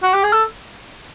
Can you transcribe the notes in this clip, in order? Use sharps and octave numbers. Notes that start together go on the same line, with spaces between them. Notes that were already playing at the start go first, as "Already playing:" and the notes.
F#4
G4
G#4
A4